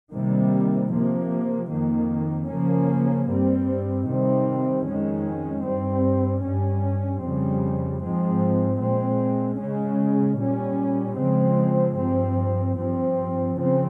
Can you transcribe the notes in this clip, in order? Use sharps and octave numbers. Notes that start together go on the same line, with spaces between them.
C3 D#3 G3 A#3
C3 F3 A#3
F2 D#3 A#3
C#3 F3 A#3 C#4
G2 G3 C4
C3 D#3 G3 C4
F2 D#3 G#3 C#4
G2 G3 C4
G2 G3 C#4
F2 C#3 G3 C4
G#2 F3 G#3 C4
A#2 G#3 C4
C#3 G#3 C#4
A#2 G3 C#4
C#3 F3 G#3 C4
G2 F3 C4
G2 F3 C4
C#3 F3 C4